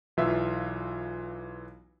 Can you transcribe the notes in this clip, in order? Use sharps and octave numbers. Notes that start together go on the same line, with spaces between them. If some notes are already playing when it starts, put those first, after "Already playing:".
B1 E3 F4 E5